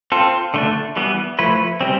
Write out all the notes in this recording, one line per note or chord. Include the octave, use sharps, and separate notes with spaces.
C4 F4 A4
D3 A3 D4
E3 G3 B3
F3 A3 E4 B4
E3 G3 C4